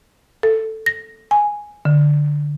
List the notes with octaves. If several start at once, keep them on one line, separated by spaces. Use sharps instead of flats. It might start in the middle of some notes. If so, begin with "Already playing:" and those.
A4
A#6
G#5
D3